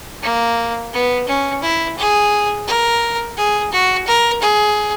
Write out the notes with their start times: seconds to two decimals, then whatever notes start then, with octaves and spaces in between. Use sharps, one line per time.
0.23 A#3
0.93 B3
1.28 C#4
1.63 E4
1.98 G#4
2.67 A#4
3.37 G#4
3.72 F#4
4.07 A#4
4.42 G#4